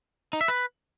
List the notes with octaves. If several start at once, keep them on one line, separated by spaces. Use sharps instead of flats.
D#4
E5
B4